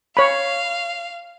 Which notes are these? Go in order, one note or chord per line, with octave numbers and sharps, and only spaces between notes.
C#5 F5 B5